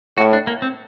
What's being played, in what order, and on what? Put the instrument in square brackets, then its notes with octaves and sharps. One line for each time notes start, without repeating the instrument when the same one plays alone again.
[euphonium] A2 [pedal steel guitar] F#4
[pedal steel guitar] D4
A#3
C4